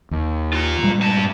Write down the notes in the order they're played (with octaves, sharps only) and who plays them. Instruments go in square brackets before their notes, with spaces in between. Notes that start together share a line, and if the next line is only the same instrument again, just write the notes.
[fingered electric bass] D#2
[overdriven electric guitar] F4 A#5
[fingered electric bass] A#2 G3 G#3
[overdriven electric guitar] G2 A5